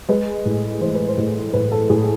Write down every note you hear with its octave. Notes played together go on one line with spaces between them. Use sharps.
G#3 B4
A2
E3 C5
B4
C5
A2
A2 B4
A4
A2 G#4